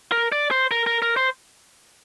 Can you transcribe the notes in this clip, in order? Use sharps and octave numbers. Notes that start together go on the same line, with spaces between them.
A#4
D5
C5
A#4
A#4
A#4
C5